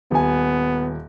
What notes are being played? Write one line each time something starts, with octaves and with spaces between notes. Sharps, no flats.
D#1 B3 G#5